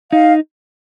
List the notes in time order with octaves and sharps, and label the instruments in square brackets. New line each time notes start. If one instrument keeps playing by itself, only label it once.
[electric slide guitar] D#4 [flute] F5